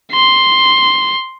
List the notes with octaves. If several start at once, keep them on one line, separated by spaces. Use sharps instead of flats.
C6